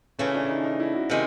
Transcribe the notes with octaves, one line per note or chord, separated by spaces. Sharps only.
C#3 E3 A3 C#4
D4
D#4
D#4
E4
F#4
C3 D#3 G#3